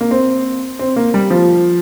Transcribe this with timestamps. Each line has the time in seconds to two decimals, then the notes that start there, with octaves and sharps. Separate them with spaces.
0.01 A#3
0.11 C4
0.79 C4
0.96 A#3
1.14 G3
1.30 F3